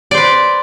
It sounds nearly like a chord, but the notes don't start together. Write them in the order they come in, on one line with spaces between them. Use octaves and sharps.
D5 C5 B4